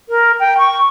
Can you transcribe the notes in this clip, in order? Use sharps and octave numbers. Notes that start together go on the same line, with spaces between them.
A#4
G5
C#6